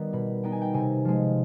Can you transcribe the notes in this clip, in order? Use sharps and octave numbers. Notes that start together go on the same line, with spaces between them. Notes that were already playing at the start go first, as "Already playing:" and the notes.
Already playing: D#3 G3 B3
B2 B5
B3 D#4 G5
G#5
G5
C3 G#5
F3 G#3